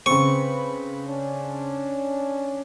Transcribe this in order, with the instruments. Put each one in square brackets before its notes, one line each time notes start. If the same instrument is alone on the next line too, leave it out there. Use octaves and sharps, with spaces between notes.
[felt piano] C#3 C4 [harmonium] B4 [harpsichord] C#6
[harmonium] C#4 D4